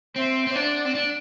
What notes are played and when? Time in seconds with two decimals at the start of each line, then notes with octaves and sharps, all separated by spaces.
0.16 C4 C5 E5
0.47 C4
0.55 D4 D5 F#5
0.85 C4
0.95 D4